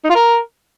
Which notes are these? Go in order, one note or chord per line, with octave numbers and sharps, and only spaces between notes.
D#4
F4
A#4